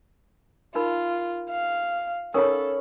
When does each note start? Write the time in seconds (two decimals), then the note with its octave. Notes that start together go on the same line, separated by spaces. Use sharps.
0.75 D#4 F4 A#4 B5
1.50 F5
2.34 C#4 D#4 A4 A#4 F5 B5 D#6